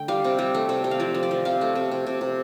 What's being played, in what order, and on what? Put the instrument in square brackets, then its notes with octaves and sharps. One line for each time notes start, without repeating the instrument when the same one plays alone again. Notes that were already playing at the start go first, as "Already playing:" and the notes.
Already playing: [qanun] D3 A3 G5
G3 F5
C3
G3
A3
C3
C3
F5
F3 D5
F3
D5
F3
C3 F5
A3
C3
C3
C3
C3